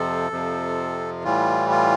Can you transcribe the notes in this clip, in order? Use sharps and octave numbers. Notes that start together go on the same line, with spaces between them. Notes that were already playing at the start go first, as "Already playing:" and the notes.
Already playing: F2 C3 F3 A4
F2 C3 F3
A2 E3 G3 F4
F4